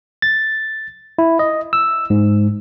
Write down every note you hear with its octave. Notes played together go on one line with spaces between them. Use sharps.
A6
E4
D#5
E6
G#2